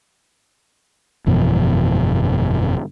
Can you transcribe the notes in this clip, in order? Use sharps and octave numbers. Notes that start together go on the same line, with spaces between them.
G1 F2 B2 E3